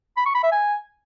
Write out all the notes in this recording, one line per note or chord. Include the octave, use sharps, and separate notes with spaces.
B5
C#6
B5
E5
G#5